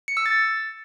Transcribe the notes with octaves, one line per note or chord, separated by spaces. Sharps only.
C#7
E6
A6